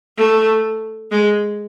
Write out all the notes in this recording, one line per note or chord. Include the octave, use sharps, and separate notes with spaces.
A3
G#3